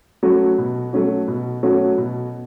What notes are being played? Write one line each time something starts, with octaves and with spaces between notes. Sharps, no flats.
F#3 A3 C#4 F#4
B2
F#3 A3 C#4 F#4
B2
F#3 A3 C#4 F#4
B2